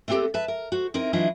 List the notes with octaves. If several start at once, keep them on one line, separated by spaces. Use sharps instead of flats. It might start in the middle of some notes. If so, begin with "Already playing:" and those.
A3 B3 C4 D4 G4 A4
B4 E5 A5
A#4
F#4 C5
C4 D#4 E4 A#4
E3 F#3 D4 E4 F4 D#5